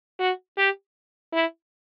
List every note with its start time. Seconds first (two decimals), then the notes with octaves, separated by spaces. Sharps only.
0.20 F#4
0.58 G4
1.33 E4